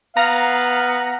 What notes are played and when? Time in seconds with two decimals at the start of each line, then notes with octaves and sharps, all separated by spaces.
0.17 B3 F5 A#5